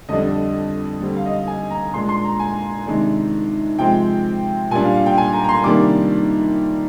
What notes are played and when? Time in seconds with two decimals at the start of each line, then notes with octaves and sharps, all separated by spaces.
0.09 F2 D3 G3 D4 D#5
1.01 D3 G3 C4
1.16 F5
1.26 D#5
1.32 F5
1.47 G#5
1.71 A#5
1.94 A#2 G#3 D4 C6
2.09 C6
2.24 A#5
2.40 G#5
2.86 C3 D#3 G#3 D4
3.79 C3 F3 G#3 C4 G5
4.71 A#2 G3 D4 G#5
4.82 F5
4.94 F5
5.06 G5
5.18 G#5
5.33 A#5
5.44 A#5
5.49 C6
5.64 C3 D#3 G3 A#3 D4 D6